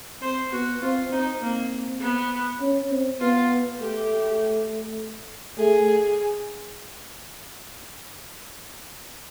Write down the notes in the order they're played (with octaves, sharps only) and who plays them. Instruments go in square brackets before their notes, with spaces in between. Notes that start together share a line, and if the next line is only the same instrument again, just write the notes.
[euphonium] C4 [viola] C5
[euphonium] B3 [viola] F#4
[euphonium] C4 [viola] F4
[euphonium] C4 [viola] D#4
[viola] A#3 [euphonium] C4
[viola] B3
[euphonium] C#4
C4
[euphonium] B3 [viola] F4
[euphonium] A3 [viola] G4
[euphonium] A3 [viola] G#4